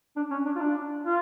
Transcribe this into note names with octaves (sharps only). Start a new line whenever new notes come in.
D4
C#4
D4
F4
D4
F4